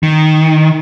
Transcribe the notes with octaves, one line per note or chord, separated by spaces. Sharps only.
D#3